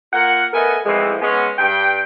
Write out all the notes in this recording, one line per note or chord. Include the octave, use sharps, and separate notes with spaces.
A#3 F4 A#4 F#5
A3 B3 A4 A#4 D#5 G#5
A2 E3 F3 G#3 C4
G#3 B3 C#4
G2 G5